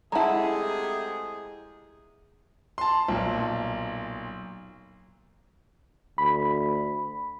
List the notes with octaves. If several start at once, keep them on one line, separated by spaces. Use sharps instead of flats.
C3 G#3 A3 E4 G#4 F#5 A5 A#5
A5 C6
B1 A#2
D2 B5